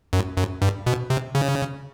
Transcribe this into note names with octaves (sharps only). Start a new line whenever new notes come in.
F#2
F#2
G2
B2
C3
C#3